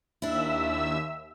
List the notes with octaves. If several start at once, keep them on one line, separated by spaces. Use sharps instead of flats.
D#2 D4 E4 E5 E6